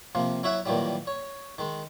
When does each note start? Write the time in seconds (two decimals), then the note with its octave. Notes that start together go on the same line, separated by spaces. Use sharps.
0.15 C3 F3 A#3
0.43 F#3 E4 C#5 E5 F#5
0.66 A#2 D#3 E3 F#3 G3
1.07 C#5
1.58 D#3 G#3